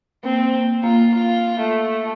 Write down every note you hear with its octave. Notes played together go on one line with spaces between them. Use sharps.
A#3 C4
A#3
A#3 F4
F4
A3